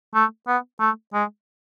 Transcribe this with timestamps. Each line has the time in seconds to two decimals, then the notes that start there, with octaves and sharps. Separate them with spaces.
0.14 A3
0.47 B3
0.80 A3
1.13 G#3